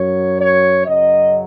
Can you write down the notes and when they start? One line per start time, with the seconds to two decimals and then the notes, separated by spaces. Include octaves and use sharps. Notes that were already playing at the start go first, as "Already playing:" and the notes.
Already playing: F#2 F#3 C#5
0.38 C#5
0.85 F#2 C#3 F#3 D#5